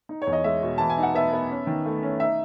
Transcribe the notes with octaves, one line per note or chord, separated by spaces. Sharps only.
D#4
C#5
E2
D#5
G#3 E5
B2
E3 A5
G#5
D#4
F#5
B3 E5
B3
C#4
D#3
A3
C#4
D#4 E5